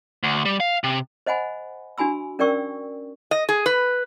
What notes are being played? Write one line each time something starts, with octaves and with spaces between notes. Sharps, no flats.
D2
G3
F5
C3
C5 D#5 F#5 G#5 B5
D4 F#4 G#5 B5 E6
C#4 A#4 D5 G5 C#6 E6
D#5
G#4
B4